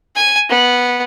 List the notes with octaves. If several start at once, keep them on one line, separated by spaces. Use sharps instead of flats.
G#5
B3